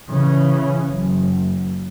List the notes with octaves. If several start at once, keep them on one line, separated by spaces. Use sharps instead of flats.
C#3 E3
F#1